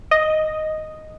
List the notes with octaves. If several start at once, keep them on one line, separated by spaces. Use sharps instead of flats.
D#5